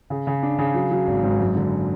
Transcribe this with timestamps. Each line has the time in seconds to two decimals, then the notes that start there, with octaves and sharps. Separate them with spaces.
0.10 C#3
0.27 C#3
0.43 D4
0.58 C#3
0.74 F#3
0.91 F#3
1.07 G#1
1.23 G#2
1.40 F#2
1.55 D3